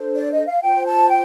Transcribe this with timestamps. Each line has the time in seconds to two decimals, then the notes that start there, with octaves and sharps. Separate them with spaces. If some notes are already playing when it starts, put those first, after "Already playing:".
Already playing: D4 A4 C5
0.16 D5
0.32 D#5
0.47 F5
0.62 F4 C5 G5
0.86 A5
1.09 G5